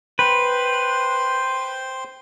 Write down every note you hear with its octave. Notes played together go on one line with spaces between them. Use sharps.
B4 C5 G5 C6